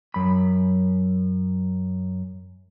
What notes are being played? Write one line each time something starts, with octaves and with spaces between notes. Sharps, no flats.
F#2 B5